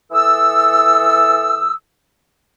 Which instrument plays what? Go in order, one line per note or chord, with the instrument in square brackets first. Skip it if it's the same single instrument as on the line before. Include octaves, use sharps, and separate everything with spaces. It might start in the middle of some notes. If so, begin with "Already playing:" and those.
[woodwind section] E3 A4 D#6 E6